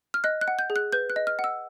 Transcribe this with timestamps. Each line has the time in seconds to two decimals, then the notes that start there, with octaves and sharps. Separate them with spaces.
0.14 F6
0.24 D#5 F#6
0.41 F#6
0.48 F#5
0.59 G6
0.70 G#4
0.76 F#6
0.92 B4 G6
1.10 F#6
1.16 D#5
1.27 F6
1.39 F#5
1.44 E6